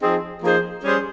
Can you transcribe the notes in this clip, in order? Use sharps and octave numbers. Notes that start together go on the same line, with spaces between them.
F3 C4 D#4 G#4
F3 A#3 D#4 G#4 C5
G3 C#4 G#4 C5